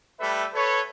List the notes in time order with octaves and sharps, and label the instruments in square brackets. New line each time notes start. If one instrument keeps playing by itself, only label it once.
[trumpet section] G3 A3 A4 B4 E5
A4 B4 C#5